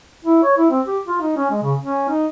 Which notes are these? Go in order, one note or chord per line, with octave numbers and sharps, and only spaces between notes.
E4
C#5
E4
C4
G4
F4
D#4
C#4
G#3
C#3
C#4
D#4